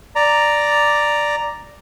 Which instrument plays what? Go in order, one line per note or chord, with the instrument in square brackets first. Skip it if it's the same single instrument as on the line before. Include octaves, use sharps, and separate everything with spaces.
[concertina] D5 A#5